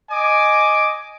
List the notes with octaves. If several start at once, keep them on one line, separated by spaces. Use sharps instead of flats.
D#5 G#5 D6